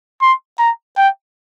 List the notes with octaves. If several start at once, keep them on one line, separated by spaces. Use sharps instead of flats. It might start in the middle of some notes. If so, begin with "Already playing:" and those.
C6
A#5
G5